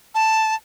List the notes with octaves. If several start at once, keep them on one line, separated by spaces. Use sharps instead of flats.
A5